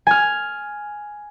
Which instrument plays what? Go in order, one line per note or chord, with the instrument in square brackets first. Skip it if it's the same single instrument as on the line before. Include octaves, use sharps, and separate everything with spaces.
[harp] G#5 F6